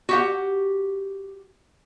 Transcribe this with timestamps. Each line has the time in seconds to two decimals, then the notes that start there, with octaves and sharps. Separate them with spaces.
0.09 F#4 G4 F#5